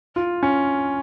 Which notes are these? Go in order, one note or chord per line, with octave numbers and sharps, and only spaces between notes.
F4
C#4